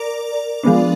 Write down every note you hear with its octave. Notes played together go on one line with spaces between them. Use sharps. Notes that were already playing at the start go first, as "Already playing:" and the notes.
Already playing: A#4 D5
F3 G#3 B3 D4